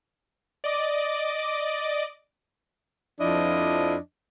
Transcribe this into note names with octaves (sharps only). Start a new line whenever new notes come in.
D5 D#5 D6
F2 F3 D4 E4 D5 D#5